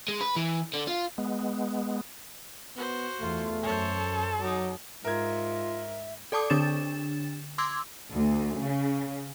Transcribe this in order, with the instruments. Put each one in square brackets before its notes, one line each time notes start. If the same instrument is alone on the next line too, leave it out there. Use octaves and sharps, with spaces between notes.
[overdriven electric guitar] G#3
B4
E3
D3
F4
[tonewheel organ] G#3 B3
[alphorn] B3 [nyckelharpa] F#4 C5
[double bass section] E2 [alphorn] A3 [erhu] F4
[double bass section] F#2 [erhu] A4 [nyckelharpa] C5 C#5
[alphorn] F#3 [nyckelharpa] D#4 D6
[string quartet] G#2 [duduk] F4 [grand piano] A#4 G#6 [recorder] E5
[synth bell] A4 D5 A5 D6 D#6
D3 D4 A6 E7
C6 D6 E6 G#6
[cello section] D2
C#3